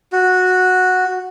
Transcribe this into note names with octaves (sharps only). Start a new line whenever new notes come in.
F#4